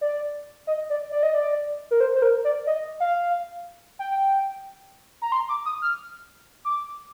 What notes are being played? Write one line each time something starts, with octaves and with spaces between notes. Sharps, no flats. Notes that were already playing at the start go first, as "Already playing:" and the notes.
D5
D#5
D5
D5
D#5
D5
A#4
C5
C5
A#4
D5
D#5
F5
G5
A#5
C6
D6
D#6
F6
D6